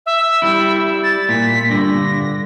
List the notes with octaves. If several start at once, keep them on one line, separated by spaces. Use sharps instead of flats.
E5
G3 E4
A6
A#2 B6
G2 D3 A#6